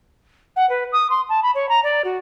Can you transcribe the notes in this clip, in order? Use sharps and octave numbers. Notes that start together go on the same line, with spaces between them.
F#5
B4
D#6
C6
A5
B5
C#5
A#5
D5
F#4